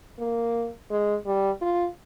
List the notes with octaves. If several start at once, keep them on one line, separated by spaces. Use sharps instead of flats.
A#3
G#3
G3
F4